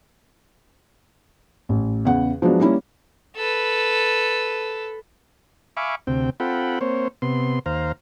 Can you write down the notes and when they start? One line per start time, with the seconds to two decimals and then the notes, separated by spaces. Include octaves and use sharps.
1.69 A1
2.05 E2 C#3 F#5
2.42 F3 F#3 G#3 B3 D4
2.60 G3 A#3 C#4 E4
3.36 A4 B4
5.77 E5 F5 G#5 B5 C#6 D6
6.07 D2 C3 C4 G5
6.40 C4 F4 A4 F#5 G5 B5
6.81 A#3 C4 C5 C#5
7.22 C3 B3 C6
7.66 D#2 C5 F5 A#5